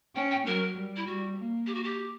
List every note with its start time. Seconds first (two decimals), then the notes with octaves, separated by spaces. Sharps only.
0.15 C#4 G5
0.31 G5
0.46 F#3 A#4
0.76 G3
0.96 E4
1.06 G3 F#4
1.37 A#3
1.67 G4
1.75 F#4
1.84 G4